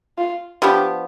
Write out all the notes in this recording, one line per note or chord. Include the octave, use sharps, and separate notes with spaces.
F4
F3 B3 D4 G4